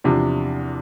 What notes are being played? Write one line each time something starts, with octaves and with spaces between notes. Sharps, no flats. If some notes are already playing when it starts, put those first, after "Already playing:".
E2 C3 F3 D4